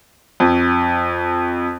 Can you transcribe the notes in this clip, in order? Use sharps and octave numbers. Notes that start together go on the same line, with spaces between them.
F2